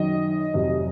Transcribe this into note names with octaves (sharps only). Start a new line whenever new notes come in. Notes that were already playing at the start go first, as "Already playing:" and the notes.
Already playing: F#2 D#3 F#3 D#5
F1 F2 C3 F#3